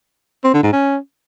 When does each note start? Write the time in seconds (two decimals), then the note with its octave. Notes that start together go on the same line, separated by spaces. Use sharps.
0.44 C4
0.54 D3
0.63 G#2
0.73 C#4